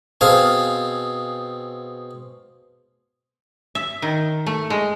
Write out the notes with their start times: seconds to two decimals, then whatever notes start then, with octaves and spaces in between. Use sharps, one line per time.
0.21 B2 C4 G#4 F5 G#5 A5
3.75 E5
4.02 D#3
4.46 A3
4.70 G#3